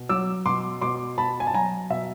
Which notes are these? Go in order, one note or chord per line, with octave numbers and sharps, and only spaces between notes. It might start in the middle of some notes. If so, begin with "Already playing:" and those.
Already playing: B2
F#3 D6 E6
B2 C6 D6
B2 C6 D6
B2 A5 B5
G#5
A5
F#3 G#5 A#5
B2 E5